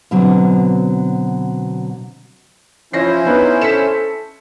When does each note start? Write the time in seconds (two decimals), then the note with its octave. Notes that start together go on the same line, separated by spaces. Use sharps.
0.11 B2 D3 F#3 C4
2.93 F3 C#4 E4 C5 C#5 A#6 C7
3.25 B3 D4 D#4 B4
3.61 A4 B6 C#7 E7